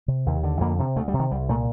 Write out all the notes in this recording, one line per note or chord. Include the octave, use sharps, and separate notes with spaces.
C3
D#2
D3
F2 A#3
C3
D2 A3
G3
C3
D#3
C2 G3
A#2 A3